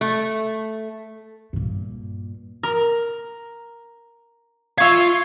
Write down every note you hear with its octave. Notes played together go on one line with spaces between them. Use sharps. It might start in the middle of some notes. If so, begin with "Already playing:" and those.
A3
G2 A#2
A#4
F4 E5 F5 C#6 G#6